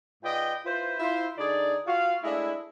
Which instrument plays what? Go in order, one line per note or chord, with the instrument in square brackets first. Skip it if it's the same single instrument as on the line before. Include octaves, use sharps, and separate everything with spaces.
[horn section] G#2 F4 B4 D5 D#5 G5
E4 F4 B4 C5
E4 F4 C5
D3 D#4 G#4 D5
F4 F#4 F5
G#3 A3 D4 E4